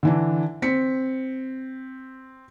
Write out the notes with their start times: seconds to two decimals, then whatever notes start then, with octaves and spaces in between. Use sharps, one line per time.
0.03 D3 E3 D4
0.62 C4 B6 C#7